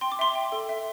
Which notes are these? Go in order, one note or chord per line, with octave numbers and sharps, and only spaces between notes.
G5 C6
D6
E5 C6
G5
A4
E5